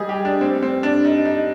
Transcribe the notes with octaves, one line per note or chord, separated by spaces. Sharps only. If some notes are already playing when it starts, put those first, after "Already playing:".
Already playing: G3 G#4 D#5
G4
D4
C4
C4
D4
D#4
D#4